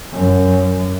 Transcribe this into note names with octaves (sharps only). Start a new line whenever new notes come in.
F#2